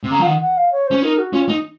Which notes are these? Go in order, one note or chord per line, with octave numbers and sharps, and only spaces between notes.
C3
C#3 A#5
F3
F5
D#3 F#5
F#5
F5
C#5
C#4 C5
D#4 A#4
F#4
C#4 F4
D#4